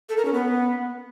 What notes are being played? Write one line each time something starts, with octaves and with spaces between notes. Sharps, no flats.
A4
A#4
C#4
B3